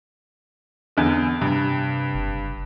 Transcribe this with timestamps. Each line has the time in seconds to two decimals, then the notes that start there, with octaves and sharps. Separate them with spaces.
0.97 E2 D3
1.41 G2 C3
2.14 F#1